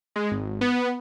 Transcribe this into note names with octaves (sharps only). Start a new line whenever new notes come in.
G#3
G#1
B3